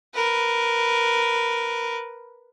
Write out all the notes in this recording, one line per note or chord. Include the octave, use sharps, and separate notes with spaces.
A#4 B4